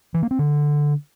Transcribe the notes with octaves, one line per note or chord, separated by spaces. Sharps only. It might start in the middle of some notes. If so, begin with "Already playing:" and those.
E3
A#3
C4
D3